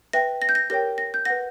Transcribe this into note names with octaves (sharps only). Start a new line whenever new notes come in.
B4 E5 G5 A#6
A#6
G6
A#6
G4 A#4 C#5 G5 A#6
A#6
G6
B4 F#5 A#6